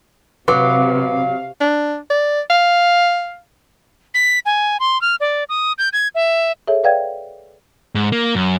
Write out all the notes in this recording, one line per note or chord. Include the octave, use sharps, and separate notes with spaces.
C3 F#3 B4 F5 D6
D4
D5
F5
B6
G#5
C6
F6
D5
D#6
G6
G#6
E5
G#4 A4 C#5 E5
B4 D5 F5 G5 G#6
G#2
A#3
F#2